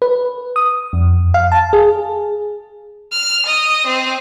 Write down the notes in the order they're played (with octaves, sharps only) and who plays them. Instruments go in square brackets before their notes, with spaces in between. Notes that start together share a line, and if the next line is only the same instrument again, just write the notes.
[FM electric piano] B4
D#6
F2
F5
A5
G#4
[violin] F6
D#5
C4